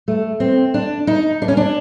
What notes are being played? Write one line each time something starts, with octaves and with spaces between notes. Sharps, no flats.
A3
C4
D4
D#4
D4
C#4
D4